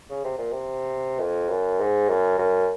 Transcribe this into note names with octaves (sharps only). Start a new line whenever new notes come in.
C#3
C3
A#2
C3
F2
F#2
G#2
F#2
F#2